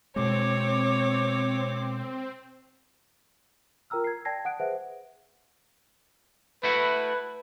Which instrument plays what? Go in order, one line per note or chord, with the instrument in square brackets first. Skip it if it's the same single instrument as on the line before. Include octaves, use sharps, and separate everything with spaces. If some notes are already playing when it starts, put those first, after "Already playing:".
[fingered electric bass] B2 G#3 [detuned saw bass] C4 [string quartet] C#5 [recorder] D6
[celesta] F4 A#4 G5 A#5 E6 F6
G#6 C7
D5 G5 A5 G#6 A#6 C7
F#5 D#6 F#6 D7
G#4 B4 C5 E5 F#5
[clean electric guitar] A3 E4 F#4 [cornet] B4